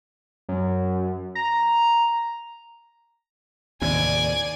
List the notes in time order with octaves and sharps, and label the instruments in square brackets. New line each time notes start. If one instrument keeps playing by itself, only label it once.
[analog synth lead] F#2
A#5
[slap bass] D#2 A2 C3 [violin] D5 G#5